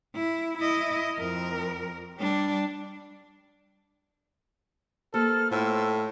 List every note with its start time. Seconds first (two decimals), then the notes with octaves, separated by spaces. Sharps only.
0.15 E4
0.58 E4 D#5
1.16 F2 A#4
2.18 G3 D4
5.14 A#3 G4 A4 C5 F6
5.51 A2 F4 C5 E6